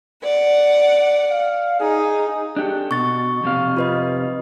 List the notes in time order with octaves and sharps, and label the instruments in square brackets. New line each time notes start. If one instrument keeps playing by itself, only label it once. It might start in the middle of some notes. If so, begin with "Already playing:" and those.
[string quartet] D5 F#5
[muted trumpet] F5
[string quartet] D#4 [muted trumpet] G#4
[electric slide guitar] D4 G4 A4
[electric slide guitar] B2 [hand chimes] C#6 A6
[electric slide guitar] F2 C3 F5
[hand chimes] F4 B4 D#5